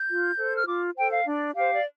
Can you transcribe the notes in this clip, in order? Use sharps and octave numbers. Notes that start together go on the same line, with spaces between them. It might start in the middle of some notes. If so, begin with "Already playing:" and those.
Already playing: G6
F4
A4 C5
F6
F4 D6
A4 C5 G5
F5
D4 D5
G4 C5 F5
D5